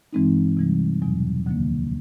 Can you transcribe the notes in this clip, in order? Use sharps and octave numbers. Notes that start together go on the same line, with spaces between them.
G2 E3 G#3 C4 D#4
C3 E3 G3
E2 B2 F#3
D2 D3 F3 A#3